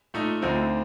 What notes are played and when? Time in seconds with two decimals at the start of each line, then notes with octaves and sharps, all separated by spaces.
0.14 A#2 A3 D#4 A4
0.42 D2 D3 F3 C4 D#4